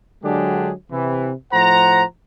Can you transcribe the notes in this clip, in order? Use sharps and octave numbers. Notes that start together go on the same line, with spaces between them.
D3 F#3 G#3 D4 G4 G#4
C3 E3
A2 F3 C5 F#5 A#5